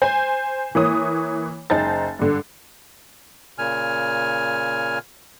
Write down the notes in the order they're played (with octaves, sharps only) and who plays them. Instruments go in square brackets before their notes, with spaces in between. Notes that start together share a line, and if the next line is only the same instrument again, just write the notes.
[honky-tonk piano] C5 G#5
E3 A#3 C#5 D#6
F#1 D#4 C5 A5 A#5 A6
G2 D3
[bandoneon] A#2 C#3 G#5 F6